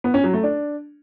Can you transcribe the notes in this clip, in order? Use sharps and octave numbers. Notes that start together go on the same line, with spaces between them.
B3
C#4
F#3
A3
D4